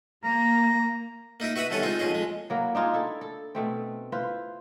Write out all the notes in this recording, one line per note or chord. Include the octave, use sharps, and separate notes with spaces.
A#3 A#5
A#3 D#4 E4 A#4
F#4 B4 E5 F#5 B5 D#6
C2 B2 D#3 C#4 A4 F#5
G#3 C4 D#4 F4
B1 F3 C#4 G#4 D#5
F2 G#3
F#3 A#3 E4
D4 D#4 F4 G#4
E4 A4
A4
B2 A3 C4
E4 F4 B4 C5